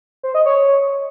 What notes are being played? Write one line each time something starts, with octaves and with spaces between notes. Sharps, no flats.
C5
D#5
C#5